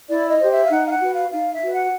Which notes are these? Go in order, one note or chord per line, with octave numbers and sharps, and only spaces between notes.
E4 D5
D#5
G4 C5
E5
F5
D#4 F#5
F5
F#5
F#4 B4
F5
D#4 F5
E5
F#4 B4
F#5